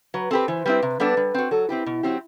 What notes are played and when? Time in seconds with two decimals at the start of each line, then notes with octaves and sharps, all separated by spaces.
0.14 F#3 B4
0.31 C4 G4 A4 B4
0.48 E3 C5
0.65 G3 C4 E4 B4
0.82 C3
1.00 G3 B3 D4 A4
1.17 G3
1.34 C4 F#4
1.51 F#3 A4
1.69 C4 E4 G4 B4
1.86 B2
2.03 F#3 C4 G4